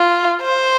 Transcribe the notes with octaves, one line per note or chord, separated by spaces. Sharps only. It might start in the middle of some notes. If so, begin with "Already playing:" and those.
Already playing: F4
C5